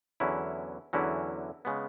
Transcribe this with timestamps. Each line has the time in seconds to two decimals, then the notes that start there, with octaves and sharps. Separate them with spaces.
0.20 E2 D3 F#3 C#4 E4
0.93 E2 D3 F#3 C#4 E4
1.65 C#3 G#3 B3